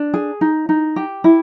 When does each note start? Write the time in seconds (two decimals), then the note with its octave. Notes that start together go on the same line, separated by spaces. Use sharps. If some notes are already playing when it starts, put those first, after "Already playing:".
Already playing: D4
0.14 G#4
0.41 D#4
0.69 D#4
0.96 G4
1.24 E4